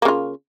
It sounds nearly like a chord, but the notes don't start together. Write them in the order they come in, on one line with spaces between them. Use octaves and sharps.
A#3 C#3 F4